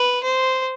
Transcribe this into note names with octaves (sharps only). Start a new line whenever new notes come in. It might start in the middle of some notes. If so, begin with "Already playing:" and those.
Already playing: B4
C5